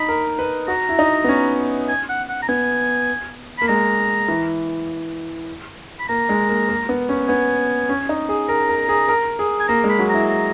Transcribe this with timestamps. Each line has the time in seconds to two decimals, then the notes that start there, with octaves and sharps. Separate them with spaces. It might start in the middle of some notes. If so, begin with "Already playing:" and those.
Already playing: D#4 B5
0.09 A#4
0.39 B4
0.68 F#4 A#5
0.89 E4
0.99 D#4
1.24 B3
1.29 C#4
1.88 G#5
2.09 F#5
2.29 F#5
2.42 A#5
2.49 B3 G#5
3.58 A#3 B5
3.68 G#3 A#5
4.28 E3
5.99 B5
6.09 A#3 A#5
6.29 G#3
6.49 A#3
6.69 A#3
6.89 B3
7.09 C#4
7.28 B3 G#5
7.89 C#4
8.09 D#4
8.29 G#4
8.49 A#4 A#5
8.69 A#4
8.89 G#4
9.08 A#4
9.39 G#4
9.60 G#5
9.68 A#3 A#5
9.84 G#3
9.89 B5
9.99 F#3
10.09 E4 A#5
10.29 A#5